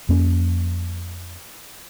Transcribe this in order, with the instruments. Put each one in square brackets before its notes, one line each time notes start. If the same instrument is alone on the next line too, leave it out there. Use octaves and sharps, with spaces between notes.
[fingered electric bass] F2 A#3 C#4